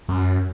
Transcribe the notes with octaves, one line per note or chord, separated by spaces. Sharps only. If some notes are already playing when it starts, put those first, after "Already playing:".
F#2